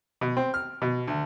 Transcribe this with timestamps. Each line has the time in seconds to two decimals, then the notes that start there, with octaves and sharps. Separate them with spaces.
0.21 B2
0.37 C4
0.54 F6
0.82 B2
1.08 D2